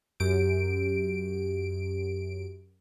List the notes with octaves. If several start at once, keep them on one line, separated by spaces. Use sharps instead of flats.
F#2 G4 D7